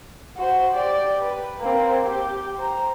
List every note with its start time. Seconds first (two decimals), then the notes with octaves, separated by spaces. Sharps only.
0.37 F#4 C5
0.75 G4 D5
1.21 B4
1.61 A#3 C4
2.05 G4
2.56 C5 A#5